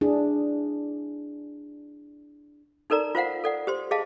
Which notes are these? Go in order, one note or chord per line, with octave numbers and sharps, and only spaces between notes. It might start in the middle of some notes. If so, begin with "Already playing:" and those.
D4 E4 G#4
D#4 A4 A#4 D5 A#5
F4 C5 F5 F#5
A4 D5 F#5
G4 C5 C6
G#4 D#5 F5 A5